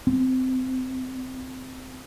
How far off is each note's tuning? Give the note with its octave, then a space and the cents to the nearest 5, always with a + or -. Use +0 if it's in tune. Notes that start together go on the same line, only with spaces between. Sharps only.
C4 -20